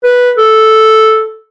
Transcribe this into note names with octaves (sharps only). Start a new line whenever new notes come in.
B4
A4